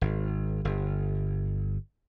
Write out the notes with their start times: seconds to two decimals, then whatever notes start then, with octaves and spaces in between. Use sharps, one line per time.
0.01 G#1
0.65 G1